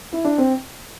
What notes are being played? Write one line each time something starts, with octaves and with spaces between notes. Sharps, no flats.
E4
D4
C4